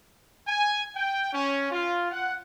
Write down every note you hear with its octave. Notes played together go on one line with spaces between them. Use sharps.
G#5
G5
C#4
F4
F#5